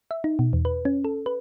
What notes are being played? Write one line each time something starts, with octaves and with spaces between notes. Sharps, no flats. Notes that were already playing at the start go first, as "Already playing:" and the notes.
E5
D#4
B2
E2
B4
C#4
A4
B4